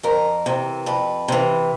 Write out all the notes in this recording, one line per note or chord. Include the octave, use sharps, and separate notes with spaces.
F2 A#4
C3 E3
F2 B4
C3 E3